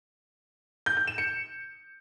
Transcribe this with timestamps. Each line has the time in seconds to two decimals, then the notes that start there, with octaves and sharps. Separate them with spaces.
0.86 G6
0.97 G6
1.07 E7
1.18 C#7